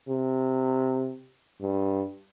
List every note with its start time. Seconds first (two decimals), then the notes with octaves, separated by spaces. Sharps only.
0.08 C3
1.61 G2